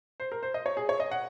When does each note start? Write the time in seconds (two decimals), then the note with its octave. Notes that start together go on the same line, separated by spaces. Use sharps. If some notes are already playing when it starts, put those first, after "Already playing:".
0.20 C5
0.32 A#4
0.43 C5
0.54 D#5
0.66 C#5
0.77 G#4
0.89 C#5
1.00 D#5
1.11 F#5